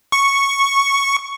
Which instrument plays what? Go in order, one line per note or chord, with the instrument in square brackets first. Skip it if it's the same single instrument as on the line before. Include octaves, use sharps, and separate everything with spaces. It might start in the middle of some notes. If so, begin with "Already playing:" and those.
[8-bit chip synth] C#6